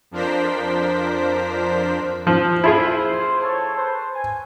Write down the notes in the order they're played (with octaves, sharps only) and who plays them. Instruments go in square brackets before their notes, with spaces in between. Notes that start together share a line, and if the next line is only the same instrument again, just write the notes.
[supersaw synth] F2 F3 D4 A#4 C5 B6
[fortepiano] F3
[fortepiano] E4 F4 G#4 [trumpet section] C5
[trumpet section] A4 C#5 A5
B4 C5
G#5